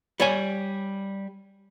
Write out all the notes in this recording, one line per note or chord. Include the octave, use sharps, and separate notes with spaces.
G3 C#5 G#5